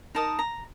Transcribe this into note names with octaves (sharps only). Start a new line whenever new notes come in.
D#4 A#4 D#5 A5
A#5